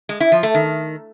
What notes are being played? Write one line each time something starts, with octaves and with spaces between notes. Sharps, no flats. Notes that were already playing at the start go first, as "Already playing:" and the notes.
G#3
E4
F3
A3
D#3